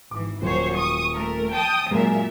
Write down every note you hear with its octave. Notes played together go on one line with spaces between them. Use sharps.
G#1 E3 D6
D#1 F#3 C5 C#5
C#6 D#6
A3 A#4
G5 A5 D#6
F#2 A#2 G#3 A#4 E5